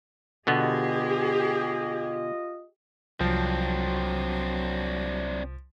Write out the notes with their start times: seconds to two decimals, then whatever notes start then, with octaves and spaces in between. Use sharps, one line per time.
0.47 B2 D3 B3 F4 G4 G#4 D#5
3.20 C2 F3 F#3 C4 D4